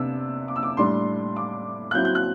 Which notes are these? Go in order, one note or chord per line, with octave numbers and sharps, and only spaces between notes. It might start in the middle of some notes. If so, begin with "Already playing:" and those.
Already playing: C3 B3 D4 E6
D6
E6
D6
A2 G3 D4 C6
D6
F#6
F#3 C4 E4 G6
G6
F#6